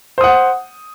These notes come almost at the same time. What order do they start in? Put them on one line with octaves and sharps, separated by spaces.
C5 D#6 F#5